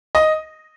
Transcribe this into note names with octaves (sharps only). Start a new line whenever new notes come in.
D#5